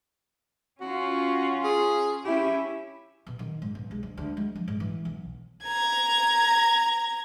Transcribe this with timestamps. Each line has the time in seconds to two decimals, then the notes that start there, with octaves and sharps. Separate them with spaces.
0.80 C#4 F4 F#4
1.64 G#4
2.25 C#4 E4 G4
3.26 B2
3.39 D#3
3.62 G#2
3.75 B1
3.91 G#3
4.03 D2
4.17 D2
4.37 G#3
4.55 F3
4.68 G#2
4.80 E3
5.05 B1
5.63 A#5 G#6